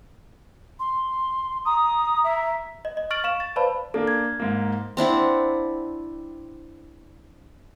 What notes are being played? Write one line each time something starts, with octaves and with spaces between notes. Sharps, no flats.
C6
A#5 D#6
E5
D#5
D#5
C#6 F6 A6 D7 F#7
F5 C#6 E7
A6
B4 C5 D5 F5 A5 B5
A#3 D4 A4
G#6
G#2 A#3
C4 D4 E4 F#5